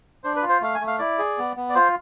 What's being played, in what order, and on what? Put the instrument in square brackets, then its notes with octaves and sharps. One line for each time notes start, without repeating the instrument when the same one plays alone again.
[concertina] D4 C5
B4
F4
C5
A3 F5
G#5
A3
F5
E4 D5
G#4
B3
B3
D5
F4 C5